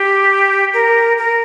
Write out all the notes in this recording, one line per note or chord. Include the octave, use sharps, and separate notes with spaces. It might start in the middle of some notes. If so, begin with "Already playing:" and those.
Already playing: G4
A#4
A#4